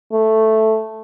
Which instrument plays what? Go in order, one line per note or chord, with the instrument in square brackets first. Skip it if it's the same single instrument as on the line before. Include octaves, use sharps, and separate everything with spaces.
[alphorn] A3